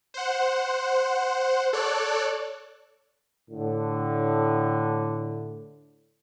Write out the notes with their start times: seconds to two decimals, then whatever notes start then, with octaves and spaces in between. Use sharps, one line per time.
0.14 C5 F#5
1.73 A4 C#5 D5 F#6
3.51 A2 D3